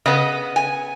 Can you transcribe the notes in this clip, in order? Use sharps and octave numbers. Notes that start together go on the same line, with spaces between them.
C#3 B3 D#5
G#5